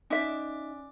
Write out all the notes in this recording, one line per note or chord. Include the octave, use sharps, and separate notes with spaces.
C#4 D#4 D5 E5 D6